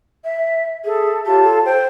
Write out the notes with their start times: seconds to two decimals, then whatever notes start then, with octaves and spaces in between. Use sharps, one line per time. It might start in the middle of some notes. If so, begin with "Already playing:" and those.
0.24 E5
0.85 G#4 A4 E5
1.26 F4 G4 C#5 A5
1.44 A4
1.65 C5 G5